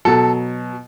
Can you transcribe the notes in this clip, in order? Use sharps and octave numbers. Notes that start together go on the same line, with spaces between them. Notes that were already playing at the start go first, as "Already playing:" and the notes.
B2 F#3 A4